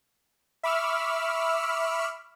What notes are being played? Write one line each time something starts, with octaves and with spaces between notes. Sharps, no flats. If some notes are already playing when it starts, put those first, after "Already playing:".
E5 B5 C#6 D6 E6 F6